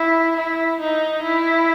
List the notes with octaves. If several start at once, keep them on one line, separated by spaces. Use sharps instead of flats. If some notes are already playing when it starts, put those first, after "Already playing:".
Already playing: E4
E4
D#4
E4